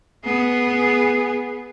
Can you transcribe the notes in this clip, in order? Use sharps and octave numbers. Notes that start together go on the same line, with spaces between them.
B3 G#4